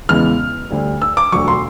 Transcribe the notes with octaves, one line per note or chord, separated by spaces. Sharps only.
E2 C#3 E3 G#3 F6
D2 D3 G3
E6
D6
E1 D2 D3 F#3 C#6
C6